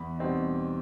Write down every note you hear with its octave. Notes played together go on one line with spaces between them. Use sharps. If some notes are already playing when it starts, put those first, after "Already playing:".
Already playing: E2 B5
B2 G3 C4 D#4